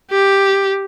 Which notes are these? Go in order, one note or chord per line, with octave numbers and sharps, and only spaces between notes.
G4